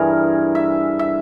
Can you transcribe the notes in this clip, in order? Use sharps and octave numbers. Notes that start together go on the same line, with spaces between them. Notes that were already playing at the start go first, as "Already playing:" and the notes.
Already playing: G2 E3 G#4 A#4
E5
E5